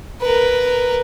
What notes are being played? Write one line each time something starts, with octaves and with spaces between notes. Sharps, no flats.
A#4 B4